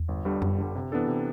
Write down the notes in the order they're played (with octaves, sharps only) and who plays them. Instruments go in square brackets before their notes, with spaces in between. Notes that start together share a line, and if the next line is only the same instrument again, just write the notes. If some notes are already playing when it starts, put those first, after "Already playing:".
Already playing: [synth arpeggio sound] E2
[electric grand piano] G1
G2 D3 G3
[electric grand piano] G1 [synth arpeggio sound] F#2
[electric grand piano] G2 D3 G3
C3
E3 B3 D4 A4
C3